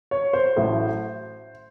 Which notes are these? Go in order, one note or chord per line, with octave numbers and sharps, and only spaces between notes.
C#5
C5
A1 A2 F#3 A3